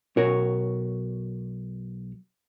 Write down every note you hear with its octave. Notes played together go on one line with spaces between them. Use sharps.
B1 F#4 A#4 C#5